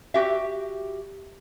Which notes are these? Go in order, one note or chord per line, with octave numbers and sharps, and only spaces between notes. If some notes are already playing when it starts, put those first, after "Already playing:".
F#4 G4 E5